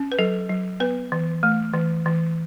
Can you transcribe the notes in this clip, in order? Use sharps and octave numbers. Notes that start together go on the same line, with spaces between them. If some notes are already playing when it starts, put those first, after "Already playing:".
Already playing: C#4
B4
F#3 A4
F#3
B3 B4
E3
A3
E3
E3